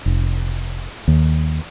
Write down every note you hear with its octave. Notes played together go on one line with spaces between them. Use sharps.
F1
D#2